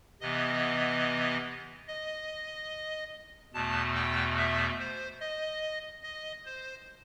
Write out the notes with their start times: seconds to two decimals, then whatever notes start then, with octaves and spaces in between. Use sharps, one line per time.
0.21 C3 E3 B3 D#5
1.88 D#5
3.54 E2 B2 A3 A5
3.95 G5
4.37 E5
4.79 C5
5.20 D#5
6.03 D#5
6.45 C5